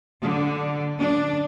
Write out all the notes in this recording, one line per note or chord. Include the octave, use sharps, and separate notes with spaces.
D3
D4